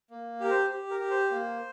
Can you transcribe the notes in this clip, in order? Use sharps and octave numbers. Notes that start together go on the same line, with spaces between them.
A#3
G4 A#4
C5
G4
A#4
G4
C5
A#3